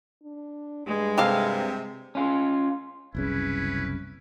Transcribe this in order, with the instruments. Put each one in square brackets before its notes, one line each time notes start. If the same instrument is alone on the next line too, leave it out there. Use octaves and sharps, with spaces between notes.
[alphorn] D4
[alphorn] G2 [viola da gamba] G#3
[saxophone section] C3 [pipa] G4 A4 F5
[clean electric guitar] C#4 F4
[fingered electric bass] F#1 C2 C#3 [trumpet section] C#4 E4 B4